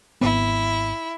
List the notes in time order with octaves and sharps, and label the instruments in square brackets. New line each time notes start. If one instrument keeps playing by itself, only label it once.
[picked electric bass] G#1 B3 [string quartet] E4